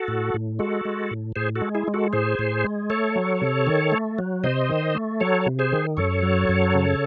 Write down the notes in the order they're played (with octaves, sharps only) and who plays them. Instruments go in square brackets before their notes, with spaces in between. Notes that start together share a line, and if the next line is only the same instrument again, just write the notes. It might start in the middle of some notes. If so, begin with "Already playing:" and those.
Already playing: [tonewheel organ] F#4 A4
A2
A2
G#3 F#4 A4
G#3
A2
A2 G#4 C5
F#4 A4
G#3
E4 G#4
G#3
F#4 A4
A2 G#4 C5
A2
G#3
A3 A4 C#5
F#3
C3
D#3
A3
F#3
C3 C5 D#5
D#3
A3
F#3 A4 C#5
C3
G#4 C5
D#3
F#2 A4 C#5
F#3
F#2
C#3